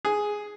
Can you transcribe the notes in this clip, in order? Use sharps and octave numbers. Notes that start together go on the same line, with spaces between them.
G#4